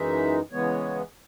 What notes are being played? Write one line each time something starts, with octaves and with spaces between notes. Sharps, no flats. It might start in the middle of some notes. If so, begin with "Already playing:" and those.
Already playing: F#2 E3 G#3 D#4 E5
C#3 E3 G#3 B3 C#5